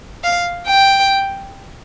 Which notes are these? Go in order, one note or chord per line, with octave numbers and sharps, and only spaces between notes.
F5
G5